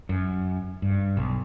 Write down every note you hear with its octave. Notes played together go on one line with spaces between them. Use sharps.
F#2
G2
B1